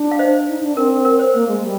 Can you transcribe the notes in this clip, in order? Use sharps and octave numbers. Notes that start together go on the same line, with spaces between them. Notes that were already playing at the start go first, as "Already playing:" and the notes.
Already playing: D4
F5
C5 D#5
D#4
D4
C4 A#4
A#4
C5
A#3
G#3
G3